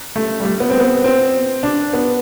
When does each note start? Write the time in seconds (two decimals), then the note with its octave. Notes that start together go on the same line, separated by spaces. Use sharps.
0.16 A3
0.40 G3
0.45 A3
0.60 B3
0.70 C4
0.80 B3
1.04 C4
1.63 D4
1.93 B3